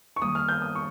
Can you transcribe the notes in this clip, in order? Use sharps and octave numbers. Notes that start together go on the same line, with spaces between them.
C#6
D#3 G3 A#3 D#6
F6
G6
D#6
C#6